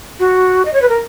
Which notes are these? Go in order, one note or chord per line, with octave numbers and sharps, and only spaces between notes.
F#4
D#5
C#5
B4
A#4